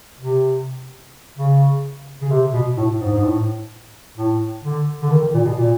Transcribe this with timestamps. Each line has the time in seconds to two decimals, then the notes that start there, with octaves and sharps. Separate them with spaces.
0.21 C3
1.38 C#3
2.22 C#3
2.31 C3
2.54 B2
2.77 A2
3.01 G#2
3.12 G#2
3.24 A2
4.18 A2
4.64 D3
5.02 D3
5.11 D#3
5.22 D#3
5.34 A#2
5.46 B2
5.57 A#2